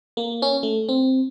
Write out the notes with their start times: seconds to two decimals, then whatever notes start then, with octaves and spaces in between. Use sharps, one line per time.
0.17 A#3
0.42 C#4
0.63 A3
0.89 C4